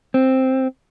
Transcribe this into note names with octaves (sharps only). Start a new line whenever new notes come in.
C4